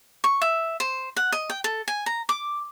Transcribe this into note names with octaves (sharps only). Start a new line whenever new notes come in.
C#6
E5
C5
F#5
D#5
G5
A4
G#5
A#5
D6